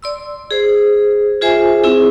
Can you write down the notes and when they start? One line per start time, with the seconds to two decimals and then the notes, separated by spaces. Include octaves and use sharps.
0.02 D5 C6 E6
0.51 G#4 C5
1.41 F4 G#4 C5 E5 G#5
1.84 C4 E4 G#4